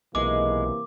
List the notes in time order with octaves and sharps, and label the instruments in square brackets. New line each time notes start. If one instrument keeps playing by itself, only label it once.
[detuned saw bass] B1 [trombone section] C3 E3 A#3 [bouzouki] G#3 [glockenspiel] D6